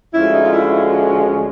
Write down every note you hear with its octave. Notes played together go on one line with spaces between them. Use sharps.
D2 D3 F3 G#3 C#4 E4
D#4
F4
E4